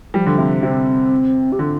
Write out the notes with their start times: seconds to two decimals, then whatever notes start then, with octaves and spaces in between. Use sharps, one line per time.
0.14 F3 G3
0.26 D3
0.38 C3
0.63 C3 C4
1.52 G4
1.59 D3 F4